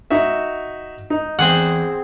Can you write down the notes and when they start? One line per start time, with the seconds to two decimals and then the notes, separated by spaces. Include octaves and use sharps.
0.10 D#4 F#4 E5
1.10 D#4
1.39 E2 C4 G#4 F#5